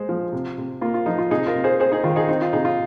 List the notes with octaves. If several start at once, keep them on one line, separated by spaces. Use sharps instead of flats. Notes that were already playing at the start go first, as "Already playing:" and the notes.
Already playing: G#3 C5
F3
C3
C3
A#3 F4
F4
F3 D#4
F4
C3 D#4 G#4
F4 A#4
C3
G#4 C5
C4 G#4 C5
D#4 G#4
D#3 F4
D#4 G#4
C4 D#4
F4
C3 D#4 G#4
F4